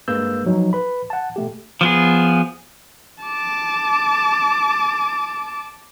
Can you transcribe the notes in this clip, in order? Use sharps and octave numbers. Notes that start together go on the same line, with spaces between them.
G2 G#3 A#3 B4 E6 G6
F3 F#3 D#4
B4 B5
F#5 A5
B2 A3 G4
F3 B3 G#4
A5 D6